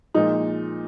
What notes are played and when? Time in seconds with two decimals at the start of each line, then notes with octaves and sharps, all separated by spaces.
0.14 A#2 F3 G#3 D#4